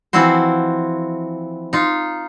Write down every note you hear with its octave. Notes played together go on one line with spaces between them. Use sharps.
E3 F3 C4 E4 F#4 C5
D#4 F4